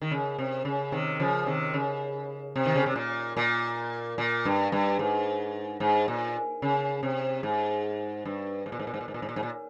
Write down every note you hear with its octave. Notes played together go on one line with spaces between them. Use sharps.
D#3
C#3
C3
C#3
C3 D#3
C#3 F3
C3 D#3
C#3
C3
D#3
C#3
C3
A#2
A#2
A#2
G2
G2
G#2
G#2
A#2
C#3
C3
G#2
G2
G#2
A#2
G#2
A#2
G#2
A#2
G#2
A#2
G#2
A#2
G#2
A#2